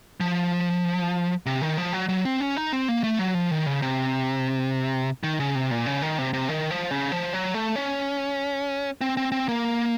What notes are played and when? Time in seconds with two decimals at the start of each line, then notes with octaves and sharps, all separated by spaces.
0.20 F3
1.46 C3
1.62 D#3
1.77 F3
1.93 F#3
2.09 F#3
2.25 C4
2.40 C#4
2.57 D#4
2.73 C4
2.88 A#3
3.04 A3
3.19 F#3
3.35 F3
3.51 D#3
3.66 C#3
3.82 C3
5.23 D#3
5.40 C#3
5.55 C3
5.71 A#2
5.86 C#3
6.02 D#3
6.19 C3
6.33 C3
6.49 D#3
6.71 F3
6.91 C#3
7.12 F3
7.33 F#3
7.54 A3
7.76 C#4
9.01 C4
9.17 C4
9.32 C4
9.49 A#3